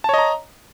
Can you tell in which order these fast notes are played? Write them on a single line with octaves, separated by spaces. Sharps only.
A5 C#5 D#5 A#5